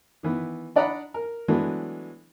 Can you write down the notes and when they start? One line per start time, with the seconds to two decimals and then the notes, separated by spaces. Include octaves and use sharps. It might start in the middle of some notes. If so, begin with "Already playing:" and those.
0.23 D#3 E3 B3
0.76 D4 D5 D#5 F#5 A#5 B5
1.14 A#4
1.48 E3 F#3 G#3 A3 B3 D4